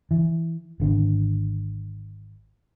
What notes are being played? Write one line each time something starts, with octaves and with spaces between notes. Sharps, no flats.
E3
G#1 D3